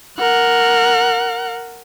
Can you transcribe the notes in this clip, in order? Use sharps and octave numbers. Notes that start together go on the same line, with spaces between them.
A#4 F#5